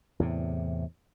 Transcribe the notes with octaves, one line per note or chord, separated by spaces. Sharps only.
E2 A2 C3